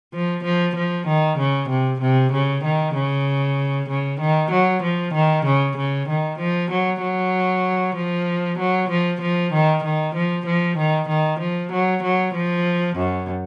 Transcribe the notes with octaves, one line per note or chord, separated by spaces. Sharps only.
F3
F3
F3
D#3
C#3
C3
C3
C#3
D#3
C#3
C#3
D#3
F#3
F3
D#3
C#3
C#3
D#3
F3
F#3
F#3
F3
F#3
F3
F3
D#3
D#3
F3
F3
D#3
D#3
F3
F#3
F#3
F3
F#2